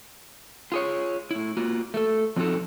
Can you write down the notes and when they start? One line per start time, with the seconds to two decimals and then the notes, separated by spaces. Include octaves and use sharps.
0.72 F4 G#4 C#5
1.31 A2 E4
1.57 A#3 F4 F#4
1.94 A3 A4
2.36 F3 C4 D#4 F#4 A4